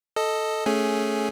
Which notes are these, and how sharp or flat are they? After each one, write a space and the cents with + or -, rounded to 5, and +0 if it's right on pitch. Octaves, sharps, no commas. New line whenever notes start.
A4 +0 D#5 +0
A3 +0 C#4 +5 G#4 +0